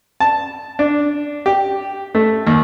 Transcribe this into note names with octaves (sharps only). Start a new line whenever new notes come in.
A5
D4
G4
A3
D#2